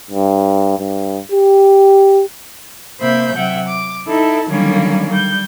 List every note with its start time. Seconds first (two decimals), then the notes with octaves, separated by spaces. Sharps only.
0.11 G2
0.79 G2
1.32 G4
3.00 C3 A#3 C5 E5 B5 G6
3.35 C3 F#3 E5 F#5 G5
3.67 D6
4.07 D#4 E4 A4 A5
4.49 D3 D#3 F#3 G3 A#3 C#4
5.10 G3 G6